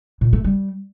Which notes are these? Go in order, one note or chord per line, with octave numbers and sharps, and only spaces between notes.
A#2
A3
G3